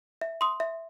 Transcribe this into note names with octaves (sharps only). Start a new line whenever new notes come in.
E5
C6 D#6
E5